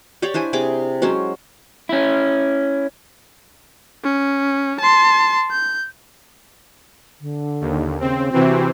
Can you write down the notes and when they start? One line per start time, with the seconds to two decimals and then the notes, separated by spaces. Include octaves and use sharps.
0.22 G4 C#5 D5 G5
0.34 D4 E4 C5 G#5
0.53 C3 G#4 G5 D6
1.02 F#3 G#3 C#4 C5
1.89 C#4 E4
4.04 C#4
4.81 A5 C6
5.51 G6
7.21 D3
7.61 D#2
8.00 C#3 C4
8.33 C3 E3 C4 F#4